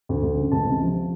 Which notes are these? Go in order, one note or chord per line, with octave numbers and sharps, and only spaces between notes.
D2
D2
C#3
C#2 A5
C3
F3